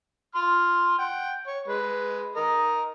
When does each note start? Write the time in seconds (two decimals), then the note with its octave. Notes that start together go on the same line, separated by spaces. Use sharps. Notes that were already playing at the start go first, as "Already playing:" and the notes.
0.35 C6 F6
0.98 F#5 G5
1.47 C#5
1.68 G#3 B4
2.36 A#4 D#5